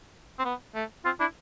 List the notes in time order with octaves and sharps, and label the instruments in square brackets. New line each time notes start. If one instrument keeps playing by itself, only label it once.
[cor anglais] C4
B3
A3
[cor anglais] C4 [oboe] F4
[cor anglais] D4 [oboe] E4